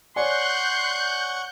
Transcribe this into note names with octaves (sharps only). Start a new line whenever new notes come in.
C#5 D5 F#5 G#5 C6 C#6 F#6 G6